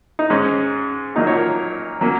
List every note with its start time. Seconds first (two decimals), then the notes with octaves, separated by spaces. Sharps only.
0.19 D#4
0.30 G#2 G#3 C#4
1.15 A#1 A#2 F#3 A#3 D#4
1.27 C#5
1.37 A#4
2.01 F#3 A#3 C#4